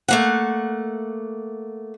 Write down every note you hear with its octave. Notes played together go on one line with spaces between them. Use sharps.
A3 A#3 F#5